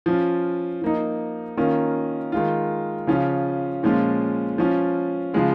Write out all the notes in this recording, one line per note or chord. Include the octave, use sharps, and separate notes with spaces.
F3 C#4 F4
F3 A#3 D#4
D#3 A#3 C#4 F4
D#3 G#3 F4
C#3 F3 C#4 F4
A#2 F3 G#3 C#4 F4
F3 C#4 F4
C#3 F3 G#3 F4